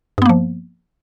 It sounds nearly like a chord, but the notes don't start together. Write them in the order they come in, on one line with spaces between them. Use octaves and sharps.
G2 B3 A#3 F3